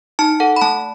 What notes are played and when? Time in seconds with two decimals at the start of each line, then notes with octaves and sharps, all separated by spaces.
0.19 D#4 A5
0.40 A4 F#5
0.56 B5
0.61 A3 A5